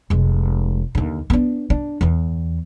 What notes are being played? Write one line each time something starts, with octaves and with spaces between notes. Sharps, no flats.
F1 G#3
D#2 D3
B3 D4
D4
E2 E3